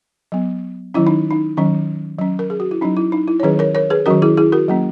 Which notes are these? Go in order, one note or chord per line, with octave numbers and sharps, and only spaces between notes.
F#3 B3
D#3 F#3 C#4 E4
D#4
D#4
D#3 F#3 C#4
F#3 C#4
A#4
G#4
F#4
E4
F#3 C#4 D#4
E4
D#4
E4
C#5
D#3 F#3 C#4 G#4 B4
A#4 C#5
A#4 C#5
G#4 B4
D#3 F#3 C#4 F#4 A#4
E4 G#4
E4 G#4
F#4 A#4
F#3 A#3 C#4